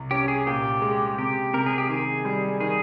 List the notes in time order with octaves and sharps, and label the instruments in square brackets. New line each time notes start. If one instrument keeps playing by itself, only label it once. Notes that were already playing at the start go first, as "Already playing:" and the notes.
Already playing: [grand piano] C2
[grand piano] C#4 [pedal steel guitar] G4
[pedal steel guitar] G#4
[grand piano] A#2 [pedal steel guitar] G4
[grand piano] G#3
[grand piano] C3 [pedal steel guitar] G4
[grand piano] C3 [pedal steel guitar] A#4
[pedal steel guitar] G#4
G4
[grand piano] D#3 [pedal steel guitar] G#4
[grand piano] G3
[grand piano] D#3 [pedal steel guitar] G#4